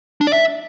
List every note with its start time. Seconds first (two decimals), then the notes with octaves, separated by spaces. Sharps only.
0.21 D4
0.27 D5
0.33 E5